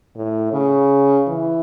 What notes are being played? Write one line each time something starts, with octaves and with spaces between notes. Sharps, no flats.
A2
C#3
E3